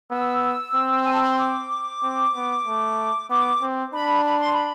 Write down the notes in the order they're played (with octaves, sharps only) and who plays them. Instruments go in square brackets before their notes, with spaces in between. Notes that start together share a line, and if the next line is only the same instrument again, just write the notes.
[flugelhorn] B3 [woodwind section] E6
[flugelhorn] C4
[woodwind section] G#5
A5
B5
C6
D6
[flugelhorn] C4
B3
A3
[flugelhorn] B3 [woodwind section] D6
[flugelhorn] C4
[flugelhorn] D4 [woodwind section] B5
[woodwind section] B5
C6
B5